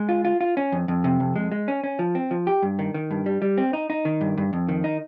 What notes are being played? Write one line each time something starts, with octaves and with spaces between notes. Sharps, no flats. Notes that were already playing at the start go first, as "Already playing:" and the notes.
Already playing: G#3
F4
F4
F4
C#4
F2
F2
C3
F2
G#3
G#3
C#4
C#4
F3
C4
F3
G4
G2
D#3
D#3
G2
G3
G3
C4
D#4
D#4
D#3
G2
G2
F2
D#3
D#4